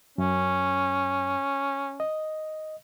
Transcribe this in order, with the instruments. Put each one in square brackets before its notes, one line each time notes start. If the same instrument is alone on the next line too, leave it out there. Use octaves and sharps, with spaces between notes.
[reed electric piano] F#2 [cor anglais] C#4
[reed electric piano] D#5